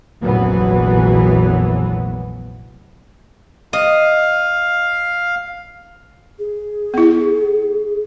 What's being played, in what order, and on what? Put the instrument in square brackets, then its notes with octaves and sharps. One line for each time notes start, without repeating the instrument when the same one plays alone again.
[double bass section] F1 A#1 F2 E3 F#3 B3
[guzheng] D#5 [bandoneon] F5
[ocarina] G#4
[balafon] B3 E4